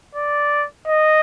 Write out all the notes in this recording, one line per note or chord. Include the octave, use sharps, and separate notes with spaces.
D5
D#5